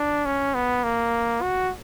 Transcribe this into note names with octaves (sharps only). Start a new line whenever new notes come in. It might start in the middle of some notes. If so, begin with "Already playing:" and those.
Already playing: D4
C#4
B3
A#3
F#4